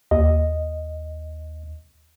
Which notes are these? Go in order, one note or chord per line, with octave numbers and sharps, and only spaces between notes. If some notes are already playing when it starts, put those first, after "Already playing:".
D#2 D#5